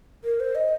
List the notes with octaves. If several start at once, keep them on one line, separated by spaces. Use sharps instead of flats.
A#4
C5
D#5